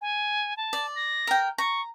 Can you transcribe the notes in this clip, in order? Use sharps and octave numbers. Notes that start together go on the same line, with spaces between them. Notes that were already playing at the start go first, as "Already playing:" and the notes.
G#5
A5
D5
A#6
A#4 G5
A#5 C#6